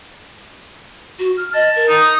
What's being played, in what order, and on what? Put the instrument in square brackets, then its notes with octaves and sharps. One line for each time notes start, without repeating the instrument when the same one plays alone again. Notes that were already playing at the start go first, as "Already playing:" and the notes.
[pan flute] F#4
F6
[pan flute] D#5 [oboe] A5
[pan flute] A#4
[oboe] D#4
[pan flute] D#6